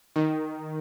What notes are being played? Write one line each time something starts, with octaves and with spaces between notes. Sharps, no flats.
D#3